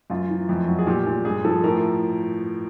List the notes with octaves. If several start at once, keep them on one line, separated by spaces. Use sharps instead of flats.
F#2 F4
E3
F2
F#3
G#4
A#2 G4
A#2
G2 G#4
F3 A4
A2 A#4